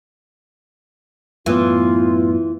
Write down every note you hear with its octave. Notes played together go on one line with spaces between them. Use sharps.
F#2 A2 E3 B3 F4